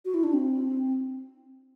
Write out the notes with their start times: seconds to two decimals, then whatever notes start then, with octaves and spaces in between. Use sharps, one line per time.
0.05 F#4
0.14 E4
0.24 D4
0.33 C4